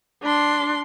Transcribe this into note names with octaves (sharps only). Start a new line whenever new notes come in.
D4 C6